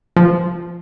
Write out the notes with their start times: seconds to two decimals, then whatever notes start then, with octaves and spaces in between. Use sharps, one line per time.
0.17 F3